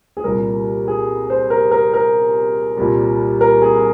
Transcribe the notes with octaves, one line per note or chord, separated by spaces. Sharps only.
G#4
C2 A#2 G3 A#4
G#4
C5
A#4
A#4
A#4
C2 A#2 G3
A#4
G#4